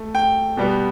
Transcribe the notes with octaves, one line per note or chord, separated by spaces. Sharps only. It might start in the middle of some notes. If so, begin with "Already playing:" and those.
Already playing: A3
G5
B2 G3 B3